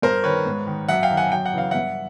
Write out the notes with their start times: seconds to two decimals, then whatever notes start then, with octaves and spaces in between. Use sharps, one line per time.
0.02 G2 A#4 C5
0.24 D#3 B4 C#5
0.46 G#2
0.67 D#3
0.89 F#2 E5 F#5
1.03 F5 G5
1.11 D#3
1.17 F#5 G#5
1.32 F#2 G5
1.45 F#5
1.53 C#3 E3 F5
1.71 G2 E5 F#5